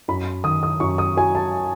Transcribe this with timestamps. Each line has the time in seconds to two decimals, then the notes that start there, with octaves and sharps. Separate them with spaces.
0.08 F#2 B5
0.44 D#3 D#6
0.63 D#6
0.80 F#2 C#6
0.98 D#6
1.17 F#3 G#5
1.35 A5